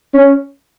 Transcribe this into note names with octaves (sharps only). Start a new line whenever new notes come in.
C#4